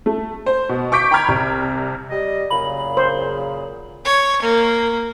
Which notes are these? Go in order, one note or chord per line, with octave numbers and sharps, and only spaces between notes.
A3
C5
B2
C#6 D6 G6 B6 D7
G5 A#5 B5 C#6 F6 G#6
C2 C3
G3 D#5
F#2 A#2 C#3 B5 F#7
C5
C#5
A#3